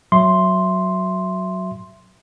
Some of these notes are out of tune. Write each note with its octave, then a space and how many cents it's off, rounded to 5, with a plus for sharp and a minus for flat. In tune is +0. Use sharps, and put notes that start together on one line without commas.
F#3 +0 E5 +10 C6 +0